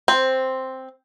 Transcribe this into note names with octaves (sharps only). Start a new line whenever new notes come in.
C4